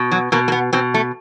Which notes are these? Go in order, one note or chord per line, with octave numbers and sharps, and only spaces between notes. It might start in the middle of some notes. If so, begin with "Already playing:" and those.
Already playing: B2
F#3
B2 A#3
A#3
B3
B2 C4
A3